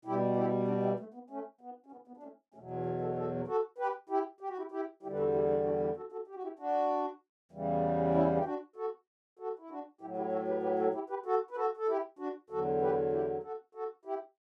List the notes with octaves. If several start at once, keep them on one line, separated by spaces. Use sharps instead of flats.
B2 G3 E4 G4
E4 G4
D4 F#4
E4 G4
A3
B3
A3 C#4
B3
C#4
B3
B3
D4
A3 C#4
E2 B2 F#3 A3 C#4
B3
B3
F#4 A4
F#4 A4
F#4 A4
G4 B4
E4 G4
G4
F#4
E4 G4
E4 G4
E2 D3 G3 E4 G4
B4
F#4 A4
E4 G4
D4 F#4
D4 F#4
E4 G4
F#4 A4
F#4 A4
G4
F#4
E4 G4
D4 F#4
E2 C#3 E3 G3
C#4 E4
G4
D4 F#4
F#4 A4
F#4 A4
E4
D4 F#4
A2 F#3 E4 G4
E4 G4
F#4 A4
G4 B4
G4 B4
F#4 A4
E4 G4
G4 B4
F#4 A4
B4
F#4 A4
A4
E4 G4
D4 F#4
E2 D3 F#3 F#4 A4
G4 B4
E4 G4
F#4 A4
F#4 A4
E4 G4